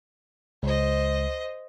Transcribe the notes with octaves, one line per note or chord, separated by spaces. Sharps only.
C#2 C5 D#5